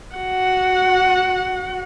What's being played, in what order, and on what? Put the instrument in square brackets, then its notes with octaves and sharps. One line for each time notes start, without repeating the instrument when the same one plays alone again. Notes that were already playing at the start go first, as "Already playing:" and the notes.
[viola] F#4 F#5